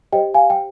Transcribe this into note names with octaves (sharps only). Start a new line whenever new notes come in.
G4 C5 D#5 G5
F5 G#5
G5